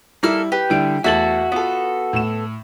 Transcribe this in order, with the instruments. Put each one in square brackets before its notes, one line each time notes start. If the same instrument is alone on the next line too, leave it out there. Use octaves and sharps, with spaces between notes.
[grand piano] G3 E4 [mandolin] A#3 A4 F6
[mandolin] G4 [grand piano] B4
[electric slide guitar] D3 [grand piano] G3 E4 D7
[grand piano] E2 A3 F#7 [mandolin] E4 A5 [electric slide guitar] F#4
[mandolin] B3 A4 [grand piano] F4
[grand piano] A2 E7